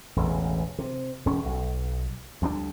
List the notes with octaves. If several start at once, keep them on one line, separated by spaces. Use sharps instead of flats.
E1 A1 E2
C3
E1 C#4
B1
D2 G3 G#3 D4